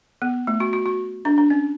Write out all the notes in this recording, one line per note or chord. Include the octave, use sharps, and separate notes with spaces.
B3
A3
F#4
F#4
F#4
D4
D4
C#4